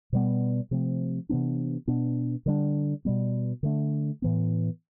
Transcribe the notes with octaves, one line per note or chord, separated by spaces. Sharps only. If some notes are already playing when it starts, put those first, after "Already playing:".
B2 G3 B3
C3 F3 A3 C4
C3 E3 B3 D4
B2 B3 D4
D3 G3 B3 D4
B2 G3 B3
D3 A3 D4
A2 E3 B3